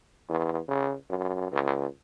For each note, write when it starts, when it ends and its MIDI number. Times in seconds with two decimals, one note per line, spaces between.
0.29 0.59 40
0.68 0.94 49
1.10 1.50 42
1.52 1.86 37